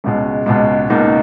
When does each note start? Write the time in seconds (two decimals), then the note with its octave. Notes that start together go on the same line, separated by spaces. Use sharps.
0.04 C#2 B2 G#3
0.46 C#2 B2 G#3
0.90 C#2 B2 A#3 D#4